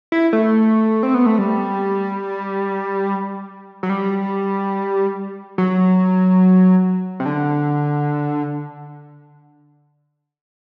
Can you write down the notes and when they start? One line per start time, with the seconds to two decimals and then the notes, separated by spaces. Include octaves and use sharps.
0.12 E4
0.33 A3
1.03 C4
1.14 B3
1.26 A3
1.38 G3
3.83 F#3
3.90 G3
5.58 F#3
7.20 C3
7.26 D3